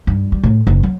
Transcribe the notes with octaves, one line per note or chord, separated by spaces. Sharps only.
G2
G3
A2
F#1
F#3